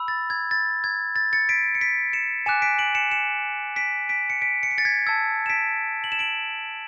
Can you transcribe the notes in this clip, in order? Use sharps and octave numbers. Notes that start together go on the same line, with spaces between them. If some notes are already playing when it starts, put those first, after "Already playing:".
Already playing: B5 E6
A6
G#6
A6
G#6
A6
A6 C#7
B6 D7
C#7
B6 D7
C#7 E7
G#5 D6 F#6 C#7 E7
B6 D7
D7 F#7
C#7 E7
C#7 E7
B6 D7
B6 D7
C#7
B6 D7
C#7
B6
A6 C#7
G#6 B6
A5 E6 G#6 B6
E7
B6 D7
F#7
E7
D7 F#7